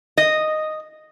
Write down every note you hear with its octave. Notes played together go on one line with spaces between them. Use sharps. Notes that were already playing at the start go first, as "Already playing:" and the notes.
D#5